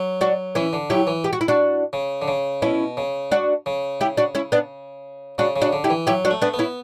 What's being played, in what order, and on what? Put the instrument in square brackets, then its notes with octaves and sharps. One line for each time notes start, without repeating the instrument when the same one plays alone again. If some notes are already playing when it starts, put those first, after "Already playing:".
Already playing: [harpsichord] F#3
[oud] D4 F#4
[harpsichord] E3 [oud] C#4 E4
[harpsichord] D3
[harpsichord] F#3 [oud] E4 G4
[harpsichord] E3
[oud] G4
F#4
E4
D4 F#4
[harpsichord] C#3
D3
C#3
[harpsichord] B2 [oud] C#4 E4
[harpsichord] C#3
[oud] D4 F#4
[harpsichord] C#3
[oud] E4 G4
D4 F#4
C#4 E4
B3 D4
[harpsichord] C#3 [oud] D4 F#4
[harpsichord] C#3
[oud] D4 F#4
[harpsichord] D3
[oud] E4 G4
[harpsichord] E3
[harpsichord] F#3 [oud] E4 G4
[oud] D4 F#4
[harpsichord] A3
[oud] B3 D4
[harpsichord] B3
[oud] C#4 E4